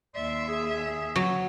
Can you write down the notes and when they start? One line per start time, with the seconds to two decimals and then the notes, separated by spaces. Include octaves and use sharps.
0.15 D#2 D5 E5 C6
0.49 G#4
1.16 F#3